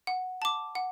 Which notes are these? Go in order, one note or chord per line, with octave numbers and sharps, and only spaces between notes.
F#5
A5 D6
F#5